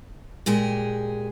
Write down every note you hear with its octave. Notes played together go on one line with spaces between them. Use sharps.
A#2 G#3 G4 G#4